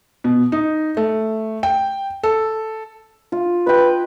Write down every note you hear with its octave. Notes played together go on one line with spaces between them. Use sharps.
B2
D#4
A3
G5
A4
F4
B4 D#5 G5